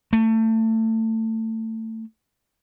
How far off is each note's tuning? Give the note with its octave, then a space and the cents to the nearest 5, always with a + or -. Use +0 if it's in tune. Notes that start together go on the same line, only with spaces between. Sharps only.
A3 +25